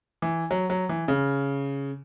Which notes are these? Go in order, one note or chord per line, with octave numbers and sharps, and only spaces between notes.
E3
F#3
F#3
E3
C#3